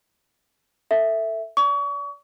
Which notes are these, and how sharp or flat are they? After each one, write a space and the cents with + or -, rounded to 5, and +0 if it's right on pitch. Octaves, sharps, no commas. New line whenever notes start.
A4 +20 E5 +0
D5 -30 C#6 +35